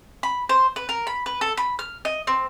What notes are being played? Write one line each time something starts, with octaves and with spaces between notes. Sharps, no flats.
B5
C5
B4
A#4
B5
B4
A4
B5
F6
D#5
C4